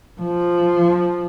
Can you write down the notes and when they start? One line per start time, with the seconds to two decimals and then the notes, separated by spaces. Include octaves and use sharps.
0.21 F3